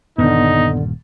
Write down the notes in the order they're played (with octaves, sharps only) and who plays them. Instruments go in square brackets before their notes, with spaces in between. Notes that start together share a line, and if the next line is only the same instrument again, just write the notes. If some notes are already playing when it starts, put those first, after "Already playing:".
[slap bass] D#1 G2 [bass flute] D3 [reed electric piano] B3 [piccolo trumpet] D#4